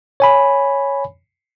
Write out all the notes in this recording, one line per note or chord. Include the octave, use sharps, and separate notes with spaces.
C#5 G#5 B5